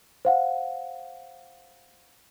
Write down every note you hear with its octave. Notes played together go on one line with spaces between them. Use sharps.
C5 F5 F#5